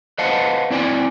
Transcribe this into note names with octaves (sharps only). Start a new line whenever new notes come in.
B4 C5 D#5 F5 F#5 A5
C4 E4 D5 G5 G#5